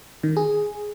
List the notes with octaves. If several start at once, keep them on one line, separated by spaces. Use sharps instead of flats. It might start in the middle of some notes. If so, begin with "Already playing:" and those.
D#3
G#4